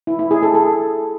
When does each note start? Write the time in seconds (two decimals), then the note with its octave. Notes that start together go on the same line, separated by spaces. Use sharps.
0.07 E4
0.19 E4
0.31 G#4
0.43 A4
0.54 A4